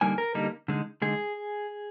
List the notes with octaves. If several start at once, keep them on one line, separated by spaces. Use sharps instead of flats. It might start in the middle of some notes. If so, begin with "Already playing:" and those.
D3 G3 A#3 D#4 G#5
A#4
D3 G3 A#3 D#4
D3 G#3 D#4
D3 G#3 D#4 G#4